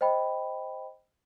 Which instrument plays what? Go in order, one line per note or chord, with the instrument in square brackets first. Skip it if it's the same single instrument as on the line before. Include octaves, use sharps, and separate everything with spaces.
[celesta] C5 D#5 G5 B5